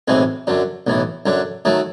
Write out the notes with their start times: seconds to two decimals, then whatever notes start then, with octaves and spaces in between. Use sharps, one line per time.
0.08 B1 A2 E3 G#3 C4
0.47 F#2 D3 F#3
0.87 B1 A2 E3
1.26 F#2 D3 F#3
1.65 D#3 F#3 A3